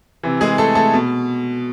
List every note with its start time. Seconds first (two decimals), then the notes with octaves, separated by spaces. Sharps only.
0.23 C3 E3
0.41 G#3 G#4
0.58 A3 A4
0.75 A3 A4
0.94 B2